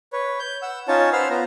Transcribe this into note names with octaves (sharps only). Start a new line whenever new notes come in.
B4 C#5
G6
F#5 E6
C#4 D#4 F4 C#5 A5
B4 C5 F#5 C6 E6 F6
B3 F4 A#5